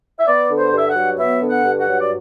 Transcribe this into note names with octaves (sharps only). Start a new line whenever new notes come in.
E5
B3 D5
D3
C5
G2 E5
F#5
F#3
B3 E5
D3
F#5
G2
F#5
F#3
D5